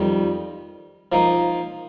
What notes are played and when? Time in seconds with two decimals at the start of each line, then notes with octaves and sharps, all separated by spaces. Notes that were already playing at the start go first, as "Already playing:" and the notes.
Already playing: F2 D#3 G3
1.12 F3 A#3 D#4